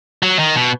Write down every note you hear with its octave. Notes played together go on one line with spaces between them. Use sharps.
F#3
D#3
B2